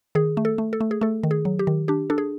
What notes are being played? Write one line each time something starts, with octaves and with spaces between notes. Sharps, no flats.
D#3 G#4
A3
A4
A3
A4
A3
G#4
A3 A4
D#3
G#4
F#3
G4
D#3
D4 G4
D4 A4
G#4